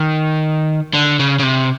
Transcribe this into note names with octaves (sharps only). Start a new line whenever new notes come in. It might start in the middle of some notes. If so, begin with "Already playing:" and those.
Already playing: D#3
D3
C#3
C#3
C3